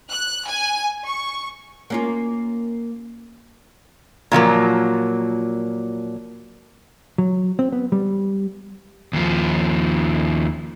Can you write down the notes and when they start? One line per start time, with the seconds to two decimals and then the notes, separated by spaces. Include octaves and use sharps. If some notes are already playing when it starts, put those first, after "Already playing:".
0.11 F#6
0.47 G#5
1.04 C#6
1.90 A#3 C#4 F4
4.32 A#2 F3 F#3 A#3
7.18 F#3
7.59 C4
7.72 B3
7.92 G3
9.13 D#2 F3